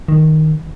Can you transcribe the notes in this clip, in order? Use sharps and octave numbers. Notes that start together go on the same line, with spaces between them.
D#3